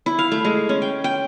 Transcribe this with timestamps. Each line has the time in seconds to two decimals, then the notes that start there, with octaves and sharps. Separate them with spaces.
0.06 E4
0.19 F5
0.31 A3
0.44 G#3
0.69 C#4
0.82 G5
1.04 G5